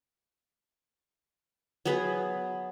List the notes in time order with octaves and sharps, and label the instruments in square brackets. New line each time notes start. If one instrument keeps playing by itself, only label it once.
[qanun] F#3 B3 G#4 B4